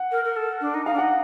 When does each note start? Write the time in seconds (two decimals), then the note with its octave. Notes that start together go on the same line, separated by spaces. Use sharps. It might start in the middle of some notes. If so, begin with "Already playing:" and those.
Already playing: F#5
0.12 A#4
0.25 A#4
0.36 A4
0.61 D4
0.74 D#4
0.86 D#4 F5
0.94 D4
0.98 D#4 F#5